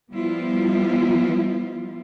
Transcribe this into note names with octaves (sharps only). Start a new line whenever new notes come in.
F3 G3 B3 E4 F4